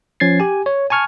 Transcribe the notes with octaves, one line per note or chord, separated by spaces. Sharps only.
F3 C#4 G#6 A6 C7
G4 G#5
C#5
G#5 A5 C#6 F6 G#6